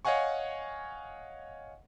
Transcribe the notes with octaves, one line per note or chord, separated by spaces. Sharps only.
C#5 D#5 F5 F#5 G#5 C#6